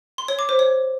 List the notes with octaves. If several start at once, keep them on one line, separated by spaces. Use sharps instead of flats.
C6
C#5
D6
C5
C#5